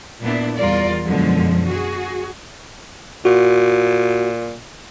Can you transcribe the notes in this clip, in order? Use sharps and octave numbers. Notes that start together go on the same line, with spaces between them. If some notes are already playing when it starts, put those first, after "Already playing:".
A#2 B3 D4 E4
E2 G3 F4 A#4 D5
F#2 B2 D3 F3 G#3
F#4 G#4
A#2 F#4